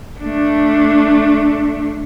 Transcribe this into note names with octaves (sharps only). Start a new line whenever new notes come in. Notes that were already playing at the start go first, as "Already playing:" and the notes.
A3 D4